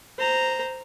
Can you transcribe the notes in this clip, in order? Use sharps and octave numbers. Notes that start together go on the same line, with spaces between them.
C5 A#5